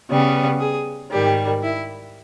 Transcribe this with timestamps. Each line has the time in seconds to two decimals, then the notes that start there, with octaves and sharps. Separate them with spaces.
0.10 C#3 G3 B3
0.60 G#4
1.11 G#2 D#3 G3 G4
1.63 E4